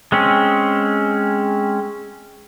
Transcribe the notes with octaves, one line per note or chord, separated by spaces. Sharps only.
G#3 C4 C#4